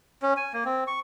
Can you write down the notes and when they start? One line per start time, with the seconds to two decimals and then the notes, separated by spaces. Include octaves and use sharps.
0.22 C#4
0.37 G#5
0.53 A#3
0.65 C4
0.87 C#6